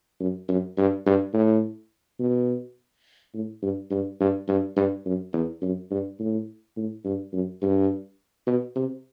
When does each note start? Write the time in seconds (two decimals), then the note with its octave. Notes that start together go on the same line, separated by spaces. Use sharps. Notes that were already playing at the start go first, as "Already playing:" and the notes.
0.20 F#2
0.48 F#2
0.77 G2
1.06 G2
1.34 A2
2.19 B2
3.34 A2
3.62 G2
3.91 G2
4.20 G2
4.48 G2
4.76 G2
5.05 F#2
5.33 E2
5.62 F#2
5.91 G2
6.19 A2
6.76 A2
7.04 G2
7.33 F#2
7.62 G2
8.47 B2
8.76 C3